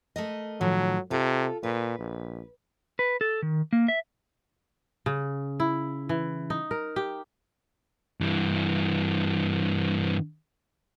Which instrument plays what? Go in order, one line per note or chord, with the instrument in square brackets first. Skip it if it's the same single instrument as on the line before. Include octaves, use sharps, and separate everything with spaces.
[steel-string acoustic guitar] A3 A#4 D#5
[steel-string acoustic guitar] A2 D#3 F3 [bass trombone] F#3
[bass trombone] C3 [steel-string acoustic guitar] F4 A4
[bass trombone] A#2 [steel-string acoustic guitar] B4
[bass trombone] A#1
[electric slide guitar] B4
A4
D#3
A#3
E5
[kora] C#3
E4
E3
D#4
A#4
G4
[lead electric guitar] G2 E3